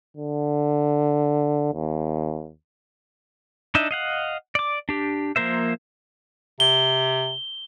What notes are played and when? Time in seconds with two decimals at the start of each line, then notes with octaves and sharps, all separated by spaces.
0.17 D3
1.74 D#2
3.75 D4 D#4 D#5 E5
3.91 D#5 F5 F#5
4.55 D5 D6
4.89 D4 G4
5.36 F3 A#3 A#4 C5 E5
6.60 C3 G7